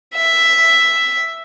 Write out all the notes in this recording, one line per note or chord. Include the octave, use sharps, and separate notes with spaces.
E5